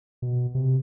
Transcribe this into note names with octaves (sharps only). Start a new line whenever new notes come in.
B2
C3